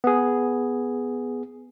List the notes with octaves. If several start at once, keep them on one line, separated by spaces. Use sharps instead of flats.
B3 G#4